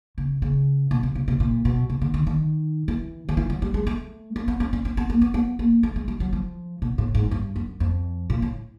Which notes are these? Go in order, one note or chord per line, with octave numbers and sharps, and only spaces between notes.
C#3
C#3
B2
C3
C3
C3
A#2
B2
C3
D3
D#3
D#3
E3
D#3
E3
F#3
G3
G#3
A3
A#3
B3
C#4
C#4
C4
B3
A#3
B3
B3
A#3
A3
G#3
G3
F#3
F3
B2
A2
G#2
G2
F#2
F2
A#2
A2